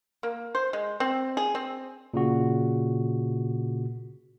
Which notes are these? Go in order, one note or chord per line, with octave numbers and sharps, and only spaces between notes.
A#3
C5
G#3
C4
G#4
C4
A#2 C#3 F#4